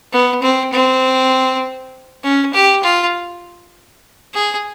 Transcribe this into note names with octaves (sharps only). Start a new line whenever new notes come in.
B3
C4
C4
C#4
G4
F4
G#4